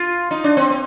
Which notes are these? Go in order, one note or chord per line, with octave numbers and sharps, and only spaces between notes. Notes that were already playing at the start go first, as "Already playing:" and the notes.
Already playing: F4
D#4
D4
C4
C4